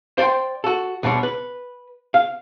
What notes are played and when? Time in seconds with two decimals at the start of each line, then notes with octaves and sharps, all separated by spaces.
0.18 C5 D5 F5 G5 C6
0.64 F#4 A4
1.03 D2 B2 G3 D4 C#5
1.23 B4
2.14 F5